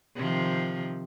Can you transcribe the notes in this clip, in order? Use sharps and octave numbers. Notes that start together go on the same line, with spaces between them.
C3 D#3 F3